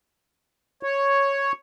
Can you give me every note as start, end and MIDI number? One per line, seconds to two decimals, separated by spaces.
0.83 1.52 73